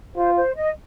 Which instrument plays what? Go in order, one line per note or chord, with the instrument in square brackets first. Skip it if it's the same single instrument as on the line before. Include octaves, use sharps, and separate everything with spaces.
[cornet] F4 [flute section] C5
[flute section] C5
D#5